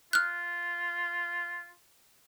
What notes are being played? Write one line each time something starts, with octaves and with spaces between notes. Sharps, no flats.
F4 F6 F#6